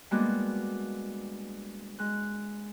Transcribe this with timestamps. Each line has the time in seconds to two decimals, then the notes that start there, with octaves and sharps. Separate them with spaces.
0.11 G3 G#3 A#3 B3 D4 F#4
1.99 G#3 F#6